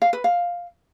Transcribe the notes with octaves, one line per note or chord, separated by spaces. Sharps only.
F5
B4
F5